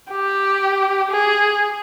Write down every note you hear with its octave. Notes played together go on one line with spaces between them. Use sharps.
G4
G#4